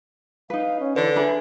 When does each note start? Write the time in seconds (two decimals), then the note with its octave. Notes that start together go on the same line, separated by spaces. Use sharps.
0.50 D#4 B4 F5
0.80 C#4
0.96 D3 E3 B4
1.16 D4 G#4 E5 B5